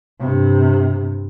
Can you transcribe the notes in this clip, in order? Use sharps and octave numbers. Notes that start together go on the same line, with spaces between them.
G2 C3